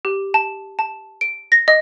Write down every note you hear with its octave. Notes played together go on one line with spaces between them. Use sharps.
G4
A5
A5
D7
A#6
D#5